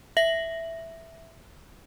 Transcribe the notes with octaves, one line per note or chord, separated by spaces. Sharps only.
E5 A#6 F#7